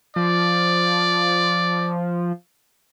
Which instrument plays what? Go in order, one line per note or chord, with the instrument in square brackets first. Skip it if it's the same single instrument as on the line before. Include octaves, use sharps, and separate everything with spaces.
[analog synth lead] F3 [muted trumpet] D5